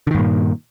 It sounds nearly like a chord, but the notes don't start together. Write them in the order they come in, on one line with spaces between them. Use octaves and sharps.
D3 D#3 G2 A#2